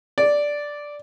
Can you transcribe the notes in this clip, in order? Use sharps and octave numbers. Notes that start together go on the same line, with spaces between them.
D5